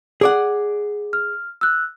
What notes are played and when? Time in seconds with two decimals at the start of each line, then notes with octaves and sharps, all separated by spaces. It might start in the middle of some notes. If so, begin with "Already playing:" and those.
0.21 G#4 D5 F#5
1.13 F6
1.61 E6 F#6